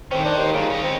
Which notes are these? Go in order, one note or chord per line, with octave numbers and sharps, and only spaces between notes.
A2 D#3 C4 C#4
D4 C5 F#5
D#2
G2 A#2 C#3
C#4 D#5
C4